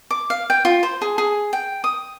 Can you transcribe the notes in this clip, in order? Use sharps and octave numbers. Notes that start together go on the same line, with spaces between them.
D6
F5
G5
F4
C5
G#4
G#4
G5
D#6